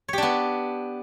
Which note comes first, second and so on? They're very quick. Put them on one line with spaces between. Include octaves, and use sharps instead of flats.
C#5 G4 D4 B3